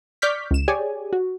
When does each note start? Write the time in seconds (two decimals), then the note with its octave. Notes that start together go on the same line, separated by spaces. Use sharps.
0.22 D5 C#6 D6 F6 G6 B6
0.51 C#2 E7
0.68 G4 G#4 C#5 D5 G#5
1.13 F#4